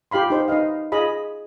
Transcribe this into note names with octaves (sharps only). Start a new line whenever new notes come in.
F4 G4 F5 B5 C6
D#4 C5
D#4 B4 D#5 F5
F4 G#4 D#5 B5